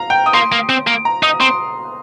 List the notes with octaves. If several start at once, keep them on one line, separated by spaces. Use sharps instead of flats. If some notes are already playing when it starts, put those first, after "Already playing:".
Already playing: F5 A#5
G5
D#6
A#3 C6
A#3
C4
A#3
A#5
D#4 D#6
C4 C6